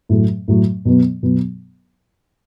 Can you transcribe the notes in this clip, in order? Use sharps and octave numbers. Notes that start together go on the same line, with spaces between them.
A2 F#3 A3
A2 F#3 A3
B2 F#3 B3
B2 F#3 B3